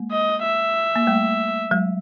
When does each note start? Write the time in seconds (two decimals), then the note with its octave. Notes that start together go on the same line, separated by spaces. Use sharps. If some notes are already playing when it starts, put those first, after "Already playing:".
Already playing: G#3 A#3
0.11 D#5
0.43 E5
0.96 A#3
1.07 G3 A3
1.71 F#3 G#3